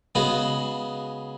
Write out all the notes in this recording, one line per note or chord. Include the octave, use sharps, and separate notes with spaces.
C#3 G#3 B3 F#4